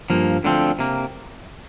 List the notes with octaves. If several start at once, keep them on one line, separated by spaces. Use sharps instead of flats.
G2 F3 A#3
D2 D3 F3 C4
C3 A#3